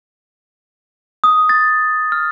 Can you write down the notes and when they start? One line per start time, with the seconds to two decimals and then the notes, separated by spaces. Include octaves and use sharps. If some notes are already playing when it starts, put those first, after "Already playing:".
1.24 D#6
1.49 A6
2.12 F6